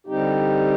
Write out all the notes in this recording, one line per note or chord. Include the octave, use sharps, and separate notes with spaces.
D3 G3 C4 D#4 G4